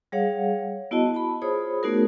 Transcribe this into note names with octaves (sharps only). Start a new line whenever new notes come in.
G3 G#4 C#5 F5 F#5
B3 E4 F#4 D#5 A5
A5 B5
F4 G#4 C5 C#5 B5 D#6
A3 B3 D#4 F#4 G#4 A#4